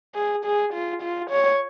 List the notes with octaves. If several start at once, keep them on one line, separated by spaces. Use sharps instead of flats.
G#4
G#4
F4
F4
C#5